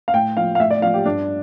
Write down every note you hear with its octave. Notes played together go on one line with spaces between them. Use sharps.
F5
A2 G5
F3 F5
F5
A2 E5
D5
F3 F5
G4
G2 D4